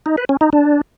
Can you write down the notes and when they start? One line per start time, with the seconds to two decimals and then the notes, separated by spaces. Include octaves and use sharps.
0.06 D#4
0.18 B4
0.29 C#4
0.41 D#4
0.53 D4